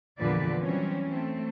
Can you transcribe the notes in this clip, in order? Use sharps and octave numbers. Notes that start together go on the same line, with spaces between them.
E2 A#2 D3 F3 B4 D5
E3 F#3 G3 C4 C#4
A3 C4